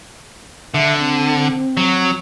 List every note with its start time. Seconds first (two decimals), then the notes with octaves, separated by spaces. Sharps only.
0.74 D3 E5
0.99 C4
1.77 F#3